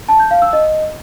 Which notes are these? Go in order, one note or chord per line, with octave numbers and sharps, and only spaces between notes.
A5
G6
F5
E6
D#5